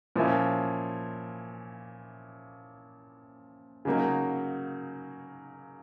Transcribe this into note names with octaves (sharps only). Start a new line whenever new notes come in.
A#2 F3 A#3 C#4 E4
C#3 F#3 A#3 D#4